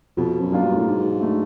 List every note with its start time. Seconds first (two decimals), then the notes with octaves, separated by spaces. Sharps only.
0.17 F2 B2
0.41 F#2
0.52 F#3 A#3 D4 F4
0.63 G2
0.77 A2
0.87 G#2 F#3
1.22 A3 D4